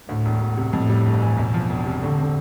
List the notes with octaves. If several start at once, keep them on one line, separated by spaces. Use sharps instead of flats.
D2 A2
E1
E1
C3
F2 A2
G3
G1
E3
E2 B2
F3
E1
C3
A2 D3
C4